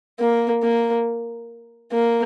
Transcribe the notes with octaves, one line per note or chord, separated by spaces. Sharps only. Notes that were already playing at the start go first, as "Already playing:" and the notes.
A#3
A#3
A#3